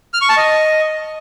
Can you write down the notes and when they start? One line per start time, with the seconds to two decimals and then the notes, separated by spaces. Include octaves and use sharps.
0.14 F6
0.21 C#6
0.29 A5
0.37 D#5